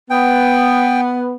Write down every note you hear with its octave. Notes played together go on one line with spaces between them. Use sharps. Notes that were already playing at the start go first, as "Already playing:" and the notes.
B3 G5